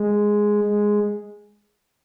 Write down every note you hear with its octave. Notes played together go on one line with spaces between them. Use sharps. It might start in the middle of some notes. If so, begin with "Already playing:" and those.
Already playing: G#3
G#3